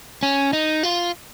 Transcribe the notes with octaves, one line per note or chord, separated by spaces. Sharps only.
C#4
D#4
F4